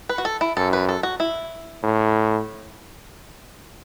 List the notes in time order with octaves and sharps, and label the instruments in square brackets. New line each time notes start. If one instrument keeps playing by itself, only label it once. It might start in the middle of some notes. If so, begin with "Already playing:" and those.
[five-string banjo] B4
F#4
A4
E4
[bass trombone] F#2 [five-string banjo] A4
[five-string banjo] B4
A4
F#4
E4
[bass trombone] A2